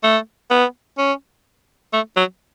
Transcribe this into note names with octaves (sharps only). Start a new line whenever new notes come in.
A3
B3
C#4
A3
F#3